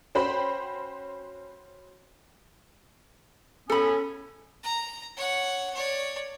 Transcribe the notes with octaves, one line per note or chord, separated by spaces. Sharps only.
C#4 F#4 C5 G5 B5
A2 B3 C#4 A4 B5
A#5
C#5 F#5
C#5 D5